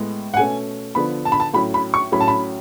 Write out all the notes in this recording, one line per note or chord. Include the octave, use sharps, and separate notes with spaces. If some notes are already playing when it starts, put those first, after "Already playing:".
Already playing: A2 G#3 B3
F#5
B2 A3 C#4 G#5
D3 F3 B3 B5
A5
B5
A5
A2 F#3 C#4 B5
B5
C#6
A2 F#3 C#4 B5
A5
B5